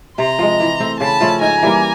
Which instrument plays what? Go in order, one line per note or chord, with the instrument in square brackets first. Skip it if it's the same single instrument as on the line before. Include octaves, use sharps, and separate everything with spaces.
[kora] C3 [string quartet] A#5 C6
[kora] F3 G#3
E3
A3 C4
[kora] C#3 [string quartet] A5 B5
[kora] F3 A3 C#4
[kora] G#2 [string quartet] G#5 A#5
[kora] E3 G3 A#3